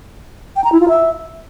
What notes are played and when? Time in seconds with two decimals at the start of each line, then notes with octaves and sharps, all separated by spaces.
0.56 G5
0.64 A#5
0.72 E4
0.80 F4
0.88 E5